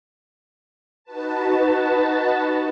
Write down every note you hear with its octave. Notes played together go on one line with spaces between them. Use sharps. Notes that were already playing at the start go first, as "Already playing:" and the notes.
D#4 F#4 B4 A5